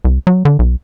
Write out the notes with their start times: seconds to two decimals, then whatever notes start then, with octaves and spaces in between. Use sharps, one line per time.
0.05 C2
0.27 F#3
0.45 D3
0.59 B1